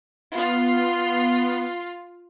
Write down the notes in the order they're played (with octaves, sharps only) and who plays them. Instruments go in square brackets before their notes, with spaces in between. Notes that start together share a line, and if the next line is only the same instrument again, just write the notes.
[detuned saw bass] B3 [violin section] F4 C6